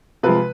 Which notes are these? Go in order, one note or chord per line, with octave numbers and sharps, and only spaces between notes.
C3 F3 G#3 B4